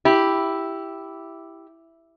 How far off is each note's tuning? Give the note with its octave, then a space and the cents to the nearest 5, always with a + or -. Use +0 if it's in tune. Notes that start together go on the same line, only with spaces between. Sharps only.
E4 +0 G4 +0